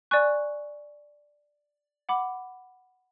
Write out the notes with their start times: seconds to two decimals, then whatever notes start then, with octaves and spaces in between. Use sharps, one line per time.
0.11 D5 G#5 C#6 F#6
2.09 F#5 B5 D6